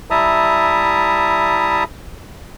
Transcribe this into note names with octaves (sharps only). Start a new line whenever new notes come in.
G3 E4 E5 A5 A#5 D#6